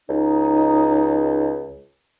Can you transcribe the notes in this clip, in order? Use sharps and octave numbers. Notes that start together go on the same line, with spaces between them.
C#2 D#4